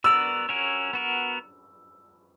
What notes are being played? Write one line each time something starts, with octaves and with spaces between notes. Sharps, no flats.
B3 F#4 A#4 D5 E6
C#4 F#4 A#4 C#5
B3 F#4 A#4